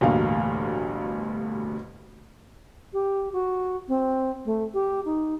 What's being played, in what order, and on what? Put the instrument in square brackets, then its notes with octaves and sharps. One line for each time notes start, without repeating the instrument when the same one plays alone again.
[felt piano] A1 D2 G2 B2 A#3 F5
[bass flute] G4
F#4
C4
A3
G4
D#4